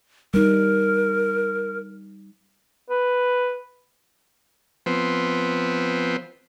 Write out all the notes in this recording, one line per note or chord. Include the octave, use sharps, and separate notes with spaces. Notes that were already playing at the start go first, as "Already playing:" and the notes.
G3 D#4 A#4
B4
F3 B3 C4